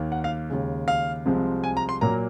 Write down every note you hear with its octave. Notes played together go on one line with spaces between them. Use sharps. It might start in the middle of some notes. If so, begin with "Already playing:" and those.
Already playing: D#2 D#3 A#3
F#5
F5
D#2 C#3 G#3
F5
C2 C3 F3 G#3 C4
G#5
A#5
C6
A#2 F#3 A#3 A#5